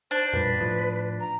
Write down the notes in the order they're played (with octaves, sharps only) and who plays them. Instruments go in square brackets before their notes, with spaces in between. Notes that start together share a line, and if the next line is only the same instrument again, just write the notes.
[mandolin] D4 [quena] C5
[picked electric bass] F2 A#2 G3 [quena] B4
[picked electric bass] A2 F3
[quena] A#5